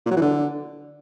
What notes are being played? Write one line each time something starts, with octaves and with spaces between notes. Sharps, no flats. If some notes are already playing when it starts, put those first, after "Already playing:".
A#2
F#3
E3
D3